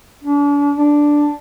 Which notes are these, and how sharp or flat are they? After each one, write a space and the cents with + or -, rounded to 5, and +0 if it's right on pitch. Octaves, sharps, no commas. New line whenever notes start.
D4 -40
D4 +0